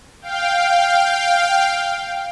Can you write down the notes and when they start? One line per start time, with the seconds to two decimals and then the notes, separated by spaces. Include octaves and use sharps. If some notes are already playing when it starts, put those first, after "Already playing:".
0.22 F5 G5